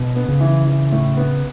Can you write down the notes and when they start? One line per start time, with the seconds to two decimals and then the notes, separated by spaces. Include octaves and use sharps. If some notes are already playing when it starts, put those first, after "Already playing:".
Already playing: B2
0.16 B3
0.28 C#3
0.41 E3
0.66 E3
0.92 A2
1.17 B3